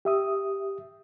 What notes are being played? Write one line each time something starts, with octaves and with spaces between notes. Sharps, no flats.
G4 E5 D#6